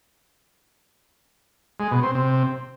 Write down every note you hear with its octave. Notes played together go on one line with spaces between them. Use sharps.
G#3
B2
C4
C3